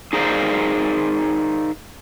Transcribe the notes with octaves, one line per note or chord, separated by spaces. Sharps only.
D#4 G#4 A#4 C5 D5 F5